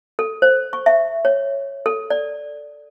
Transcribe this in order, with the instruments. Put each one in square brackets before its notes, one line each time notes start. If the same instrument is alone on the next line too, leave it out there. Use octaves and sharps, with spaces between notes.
[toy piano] A4
C5
C#6
E5
C#5
A4
D5